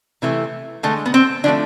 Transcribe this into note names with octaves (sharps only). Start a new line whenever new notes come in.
C3 E3 A3
D3 G#3 A3
B3
C4
D3 F3 A3 D4